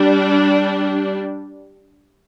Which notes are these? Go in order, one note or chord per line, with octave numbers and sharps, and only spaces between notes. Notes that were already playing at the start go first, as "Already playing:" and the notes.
Already playing: G3 D4